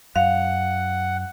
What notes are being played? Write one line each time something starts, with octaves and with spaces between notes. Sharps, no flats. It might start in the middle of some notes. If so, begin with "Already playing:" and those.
F#2 F5 F#5